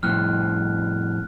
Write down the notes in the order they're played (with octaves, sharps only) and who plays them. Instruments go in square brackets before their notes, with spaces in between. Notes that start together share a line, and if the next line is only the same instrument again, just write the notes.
[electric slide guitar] F2 A2 [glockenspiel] F6 F#6